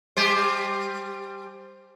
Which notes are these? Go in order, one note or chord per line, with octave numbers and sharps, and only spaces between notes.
G3 G4 C5